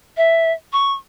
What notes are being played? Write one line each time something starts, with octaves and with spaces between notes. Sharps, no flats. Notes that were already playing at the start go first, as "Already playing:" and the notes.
E5
C#6